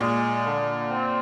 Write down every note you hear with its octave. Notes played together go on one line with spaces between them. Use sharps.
A#2 G#3
D3
C4